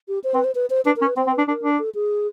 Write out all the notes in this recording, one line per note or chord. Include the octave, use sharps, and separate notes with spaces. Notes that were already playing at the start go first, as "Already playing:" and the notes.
G4
C5
C4 B4
C5
B4
C5
D4 B4
A#4
C#4
B4
C4 C5
C4
B4
D4
D4 A#4
D4
A4
G#4